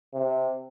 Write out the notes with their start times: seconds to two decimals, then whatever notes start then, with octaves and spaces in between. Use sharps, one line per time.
0.14 C3